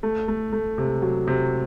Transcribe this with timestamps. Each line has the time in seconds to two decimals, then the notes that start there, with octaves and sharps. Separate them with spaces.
0.03 A3
0.28 A3
0.53 A3
0.78 C3
1.02 F#3
1.27 C3